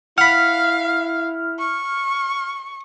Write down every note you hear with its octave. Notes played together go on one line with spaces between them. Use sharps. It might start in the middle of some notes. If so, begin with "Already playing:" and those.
E4 F5 F#5 B5 F6
C#6